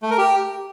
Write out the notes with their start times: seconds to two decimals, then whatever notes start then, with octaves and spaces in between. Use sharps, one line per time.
0.02 A3
0.10 A#4
0.18 G4